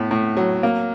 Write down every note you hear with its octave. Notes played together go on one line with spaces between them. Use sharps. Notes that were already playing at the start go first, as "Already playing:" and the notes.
Already playing: A2 B3
A2
F#3
A#3